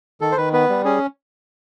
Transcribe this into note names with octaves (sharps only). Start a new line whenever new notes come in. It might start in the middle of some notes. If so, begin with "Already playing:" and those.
D#3 A4
C5
D#3 B4
B3 B4
G3
C#4 G#4